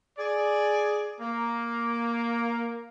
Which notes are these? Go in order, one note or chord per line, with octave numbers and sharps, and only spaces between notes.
G#4 D5
A#3